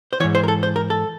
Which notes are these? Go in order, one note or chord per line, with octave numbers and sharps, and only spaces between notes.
C5
G#2 E3 C#5
C5
A#4
A4
C5
A#4
A4